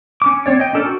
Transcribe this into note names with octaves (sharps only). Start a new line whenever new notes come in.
C#4 D6
C4 C#5 D5
D#5 G5
C#4 D4 A4 A#4 D5
F#4